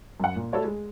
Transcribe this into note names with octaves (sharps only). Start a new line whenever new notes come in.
F#2 F#5
A#2
A3 F#4 A4 B4 C#5 D5
G#3